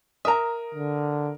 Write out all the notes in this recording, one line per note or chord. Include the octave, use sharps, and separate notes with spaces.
A#4 E5 A#5 D#6
D3